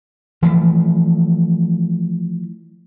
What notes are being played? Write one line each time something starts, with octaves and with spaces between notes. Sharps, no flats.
E3 F3 A3